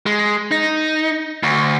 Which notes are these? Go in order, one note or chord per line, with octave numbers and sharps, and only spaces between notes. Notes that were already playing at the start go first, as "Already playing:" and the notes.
G#3
D#4
D2